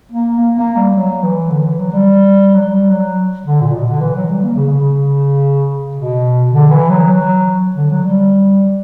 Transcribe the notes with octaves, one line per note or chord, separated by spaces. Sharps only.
A#3
A#3
A#3
G3
F#3
E3
D3
E3
F#3
G3
F#3
G3
F#3
D3
A#2
B2
D3
E3
F#3
G3
A#3
C#3
C#3
B2
D3
E3
F#3
F#3
D3
F#3
G3